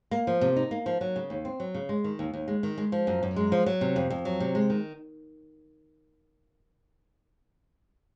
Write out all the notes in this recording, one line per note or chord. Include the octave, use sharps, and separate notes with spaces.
A#3
F3
C3
D#4
A#3
F3
F#3
C#3
D#2
C4
F#3
C#3
G#3
D#3
D#2
D#2
G#3
D#3
G#3
F3
F#2
F#2
G#3
F3
F#3
C3
F2
F2
F#3
C3
G#3
D#3